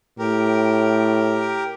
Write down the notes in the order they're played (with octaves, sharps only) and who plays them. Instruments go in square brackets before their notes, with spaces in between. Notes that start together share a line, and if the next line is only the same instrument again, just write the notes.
[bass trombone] A2 [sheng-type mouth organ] G4 A#4